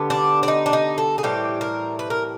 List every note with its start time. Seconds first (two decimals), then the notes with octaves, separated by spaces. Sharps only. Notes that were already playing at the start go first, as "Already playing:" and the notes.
Already playing: D3 G3 B3
0.10 D4
0.43 D4
0.48 D#4
0.66 D4
0.73 D#4
0.98 A4
1.18 G#4
1.23 A2 E3 G3 C4 G4
1.61 A#4
1.99 B4
2.10 A#4